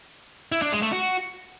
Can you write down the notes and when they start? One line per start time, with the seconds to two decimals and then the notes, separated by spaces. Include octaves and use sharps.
0.52 E4
0.62 D4
0.72 G#3
0.82 A3
0.92 F#4